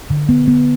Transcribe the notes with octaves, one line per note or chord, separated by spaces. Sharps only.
D3
B3
B3